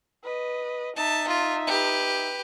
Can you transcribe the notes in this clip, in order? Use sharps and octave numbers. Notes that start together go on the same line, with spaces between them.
B4 D#5
D#4 E5 A5
F4
G4 B4